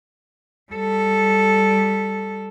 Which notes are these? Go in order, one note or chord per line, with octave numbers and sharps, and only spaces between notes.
G3 A4